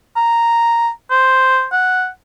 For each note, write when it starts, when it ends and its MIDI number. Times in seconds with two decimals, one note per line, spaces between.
0.16 0.90 82
1.10 1.66 72
1.72 2.08 78